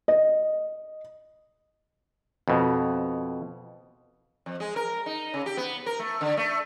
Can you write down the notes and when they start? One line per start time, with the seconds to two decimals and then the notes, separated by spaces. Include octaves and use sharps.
0.08 D#5
2.48 F2 B2
4.46 F2
4.60 G#3
4.76 A#4
5.06 D#4
5.34 C#3
5.46 G4
5.57 B3
5.86 A#4
5.99 A3
6.21 D3
6.37 A3